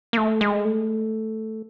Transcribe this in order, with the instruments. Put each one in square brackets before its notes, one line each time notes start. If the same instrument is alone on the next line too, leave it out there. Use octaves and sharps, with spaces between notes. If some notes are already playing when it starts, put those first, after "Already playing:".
[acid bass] A#3
A3
G#3
A3